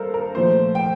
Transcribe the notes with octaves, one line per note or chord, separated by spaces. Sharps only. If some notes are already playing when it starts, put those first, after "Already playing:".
Already playing: G2 A4 A#4 C5 F5
A#4
A#2 F3 A3 C5
G5